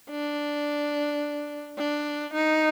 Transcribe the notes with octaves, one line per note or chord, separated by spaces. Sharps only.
D4
D4
D#4